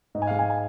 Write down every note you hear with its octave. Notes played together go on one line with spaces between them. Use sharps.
G#2 D#5
G#5
F5
G#3
G#5
G#5